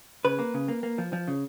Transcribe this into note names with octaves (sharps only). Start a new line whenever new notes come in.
C#3 B4
A#3
C#3
A#3
A#3
F3
F3
C#3